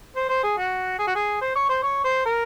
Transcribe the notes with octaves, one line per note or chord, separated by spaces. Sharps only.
C5
C5
G#4
F#4
G#4
F#4
G#4
C5
C#5
C5
C#5
C5
A#4